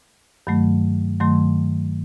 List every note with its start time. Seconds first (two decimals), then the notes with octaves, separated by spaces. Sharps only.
0.47 G2 D#3 F#3 A3
1.20 G2 D#3 F#3 A3 C6